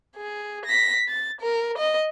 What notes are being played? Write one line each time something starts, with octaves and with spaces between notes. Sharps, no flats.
G#4
A#6 B6
A6
A#4
D#5